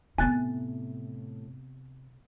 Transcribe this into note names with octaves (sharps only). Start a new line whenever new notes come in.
A2 C3 B3 G#5 F#6 A6